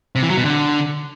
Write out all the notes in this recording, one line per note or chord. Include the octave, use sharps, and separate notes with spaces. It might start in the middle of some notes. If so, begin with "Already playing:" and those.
C3
E3
F#3
B2
D3